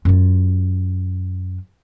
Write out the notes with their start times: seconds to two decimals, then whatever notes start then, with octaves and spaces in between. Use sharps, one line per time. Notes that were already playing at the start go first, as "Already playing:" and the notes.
0.05 F#2 F4